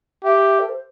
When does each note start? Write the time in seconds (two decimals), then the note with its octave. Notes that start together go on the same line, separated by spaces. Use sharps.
0.24 G4 E5
0.59 A4
0.68 C5